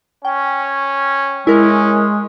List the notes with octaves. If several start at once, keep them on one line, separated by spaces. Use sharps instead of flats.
C#4 G5
G#3 C#4 E4 A#4